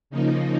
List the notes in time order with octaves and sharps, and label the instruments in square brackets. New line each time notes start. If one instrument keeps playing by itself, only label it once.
[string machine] C#3 F3 A#3 D#4